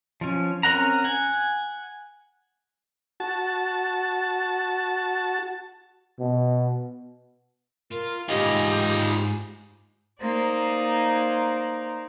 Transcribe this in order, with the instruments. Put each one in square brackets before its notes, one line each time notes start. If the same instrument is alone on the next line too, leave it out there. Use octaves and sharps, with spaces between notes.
[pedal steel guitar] F3 C#4
C4 C#4 A#4 F#5 A#5
F#5 G#5
[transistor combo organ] F#4 A5
[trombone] B2
[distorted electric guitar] F4 [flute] A#4
[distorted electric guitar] G#2 G#5 [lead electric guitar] D#4 F4 [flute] G4
[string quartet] A#3 D#4 C5 D5